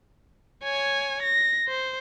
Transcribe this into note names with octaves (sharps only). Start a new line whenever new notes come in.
C#5 G#5
A#6
C5